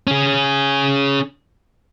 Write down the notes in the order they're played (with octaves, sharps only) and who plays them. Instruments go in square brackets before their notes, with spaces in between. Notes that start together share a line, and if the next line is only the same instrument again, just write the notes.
[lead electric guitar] C#4 G#4